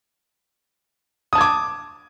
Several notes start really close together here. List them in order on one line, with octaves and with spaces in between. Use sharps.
D#6 A5 G#6 D6